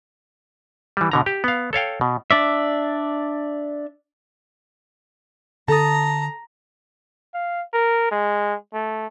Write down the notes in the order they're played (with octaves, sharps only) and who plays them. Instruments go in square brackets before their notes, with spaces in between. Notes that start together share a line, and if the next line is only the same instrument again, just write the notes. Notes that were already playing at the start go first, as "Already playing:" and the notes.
[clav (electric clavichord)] E3 G3
B2 D3 A#5
G4
B3 F5
A4 C#5 F5 G5
B2
[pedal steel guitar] D4 D5 E5
[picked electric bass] D3 [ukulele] A4 [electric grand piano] A5 D#6 [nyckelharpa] A#5
[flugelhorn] F5
A#4
G#3
A3